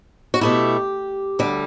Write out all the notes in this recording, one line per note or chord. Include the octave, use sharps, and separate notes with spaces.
F#4
B2 A3 E4 G4
D2 D3 G3